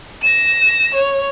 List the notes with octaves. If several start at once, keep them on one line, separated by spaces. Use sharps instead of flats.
A#6 E7
C#5